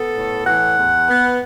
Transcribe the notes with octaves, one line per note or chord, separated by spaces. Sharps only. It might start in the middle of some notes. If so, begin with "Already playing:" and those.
Already playing: B3 A4
A2
E3 F#5
E2
B3